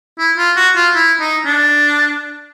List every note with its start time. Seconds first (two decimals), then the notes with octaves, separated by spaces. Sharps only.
0.19 E4
0.38 F4
0.57 F#4
0.76 F4
0.95 E4
1.20 D#4
1.45 D4